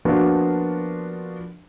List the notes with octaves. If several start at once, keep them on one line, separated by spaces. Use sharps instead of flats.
F3 A#3 B3 D4 F4 F#4